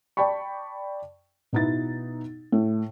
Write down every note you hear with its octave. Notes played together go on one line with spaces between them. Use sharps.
D5 G5 A5 B5 C#6
B2 B3 D#4 E4 A6
A2